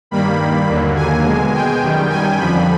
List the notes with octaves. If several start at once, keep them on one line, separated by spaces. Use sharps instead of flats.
G2 D#3 G3 A#3 B5
D#2 D3 F#3 A#3
G#5
B2 G#3
G5
F#2 D#3 G3
G#5
F2 D3 F3 B5